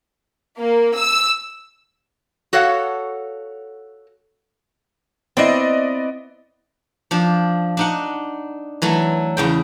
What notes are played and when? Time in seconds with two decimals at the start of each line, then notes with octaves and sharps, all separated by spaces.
0.59 A#3
0.96 E6
2.53 F#4 A4 C#5 F5 F#5
5.37 B3 C4 E4 D5 D#5
7.11 F3 D4
7.77 D4 D#4 F#5
8.82 E3 F#3 A3
9.37 E2 C#3 G5